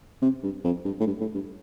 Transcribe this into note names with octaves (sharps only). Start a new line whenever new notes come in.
C3
G2
F2
G2
A2
G2
A2
G2